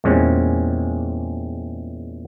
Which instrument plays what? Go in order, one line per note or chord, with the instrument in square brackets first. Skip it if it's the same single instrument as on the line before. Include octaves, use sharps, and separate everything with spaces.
[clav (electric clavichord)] E2 A#2 G3 G#3 C4 C#4